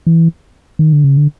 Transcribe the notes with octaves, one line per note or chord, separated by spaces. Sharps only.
E3
D#3
D3
C#3
D3